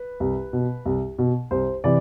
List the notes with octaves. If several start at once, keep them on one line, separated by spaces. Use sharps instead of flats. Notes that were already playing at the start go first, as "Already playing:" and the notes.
Already playing: B4
C2
B2
C2
B2
C2 C5
C3 E3 D5